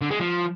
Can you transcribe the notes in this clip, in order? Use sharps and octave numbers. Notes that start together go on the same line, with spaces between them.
D3
G#3
F3